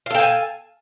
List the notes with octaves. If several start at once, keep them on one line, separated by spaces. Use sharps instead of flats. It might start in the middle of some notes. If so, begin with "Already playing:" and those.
A4 F5 G5 G#5